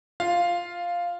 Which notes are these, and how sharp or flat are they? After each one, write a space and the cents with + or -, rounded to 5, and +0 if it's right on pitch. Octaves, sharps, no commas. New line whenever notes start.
F4 +0 F5 +0